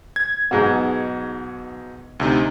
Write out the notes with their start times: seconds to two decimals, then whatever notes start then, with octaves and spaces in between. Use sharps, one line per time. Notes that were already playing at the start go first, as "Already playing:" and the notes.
0.16 G#6
0.51 B1 G#2 B2 G#4 F#5
2.20 D2 C3 D#4